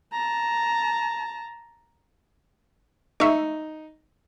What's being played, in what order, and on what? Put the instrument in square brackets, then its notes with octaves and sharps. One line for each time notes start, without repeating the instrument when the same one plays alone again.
[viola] A5 A#5
[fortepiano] D#4 [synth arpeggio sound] E5 C#6